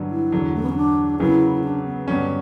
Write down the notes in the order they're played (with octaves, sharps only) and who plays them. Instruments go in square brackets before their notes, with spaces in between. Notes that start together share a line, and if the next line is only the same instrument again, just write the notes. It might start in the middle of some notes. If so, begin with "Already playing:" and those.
Already playing: [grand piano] G2 D3 F#3 B3
[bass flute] E4
[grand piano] E2 D3 F#3
[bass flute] A3
B3
C#4
D4
[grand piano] F#2 C#3 F#3 B3 [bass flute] E4
[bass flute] D4
B3
[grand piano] G2 D3 F#3 C#4 [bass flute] B3